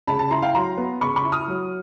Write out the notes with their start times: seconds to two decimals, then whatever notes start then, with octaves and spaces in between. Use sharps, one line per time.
0.07 C#3 A5 B5
0.19 A5 B5
0.31 E4 A#5 C6
0.42 F5 G5
0.54 F#3 A#5 C6
0.77 B3
1.01 C#3 B5 C#6
1.16 B5 C#6
1.24 E4
1.32 D#6 F6
1.48 F#3